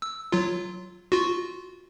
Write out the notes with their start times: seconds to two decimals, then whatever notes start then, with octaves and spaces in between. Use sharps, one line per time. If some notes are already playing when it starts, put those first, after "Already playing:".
0.02 E6
0.32 F#3 F4
1.12 F4 F#4